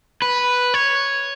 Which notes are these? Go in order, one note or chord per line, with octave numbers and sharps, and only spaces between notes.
B4
C#5